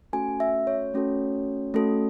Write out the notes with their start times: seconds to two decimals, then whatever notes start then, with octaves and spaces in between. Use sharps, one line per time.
0.13 A3 C#4 F#4 A4 G#5
0.40 E5
0.67 C#5
0.94 A3 C#4 F#4 A4
1.74 A3 C#4 F#4 A4